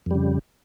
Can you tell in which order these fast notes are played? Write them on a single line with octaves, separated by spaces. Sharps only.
F2 G3 C#3